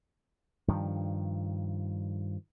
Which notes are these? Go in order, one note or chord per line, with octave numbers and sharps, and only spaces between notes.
G2 D#3 F3